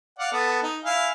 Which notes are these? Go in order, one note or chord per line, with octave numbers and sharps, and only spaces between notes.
D5 F5 F#5
B3 A4 F#5
D#4
E4 F5 G#5